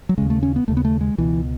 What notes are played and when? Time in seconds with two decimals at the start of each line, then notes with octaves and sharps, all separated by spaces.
0.09 F#3
0.18 D#2 C#3 G#3
0.30 A3
0.43 C#4
0.56 B3
0.68 D#2 C#3 A3
0.77 B3
0.85 A3
1.01 G#3
1.18 C#2 B2 E3